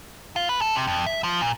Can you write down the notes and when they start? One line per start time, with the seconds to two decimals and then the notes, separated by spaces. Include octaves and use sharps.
0.36 F4
0.49 B4
0.61 A4
0.75 C3
0.87 F2
1.06 E5
1.24 F3
1.41 A#2